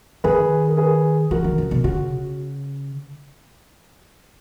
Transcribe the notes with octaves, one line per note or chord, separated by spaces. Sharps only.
D#3 G#4 B4
A#4
G#4 B4
E3 F#4 A#4
D#3
C#3
B2
C#3 F#4